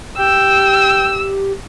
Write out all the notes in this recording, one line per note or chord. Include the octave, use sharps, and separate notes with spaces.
G4 G5 E6